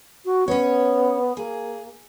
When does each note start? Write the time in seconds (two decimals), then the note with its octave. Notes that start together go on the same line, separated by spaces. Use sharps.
0.25 F#4
0.48 B3 C#4 C#5
1.37 A#3 G#4